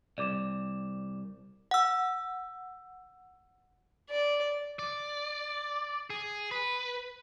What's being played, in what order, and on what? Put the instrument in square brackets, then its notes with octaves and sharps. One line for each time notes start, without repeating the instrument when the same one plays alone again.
[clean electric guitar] C2 [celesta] D5 D6 E7
[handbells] F#5 E6
[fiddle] D5
[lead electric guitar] D5
G#4
B4